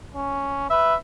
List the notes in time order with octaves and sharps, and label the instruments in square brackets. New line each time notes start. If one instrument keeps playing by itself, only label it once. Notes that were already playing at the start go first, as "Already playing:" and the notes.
[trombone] C#4
[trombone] B4 [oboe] E5